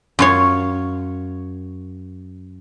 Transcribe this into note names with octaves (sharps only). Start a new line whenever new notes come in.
F#2 F4 C#5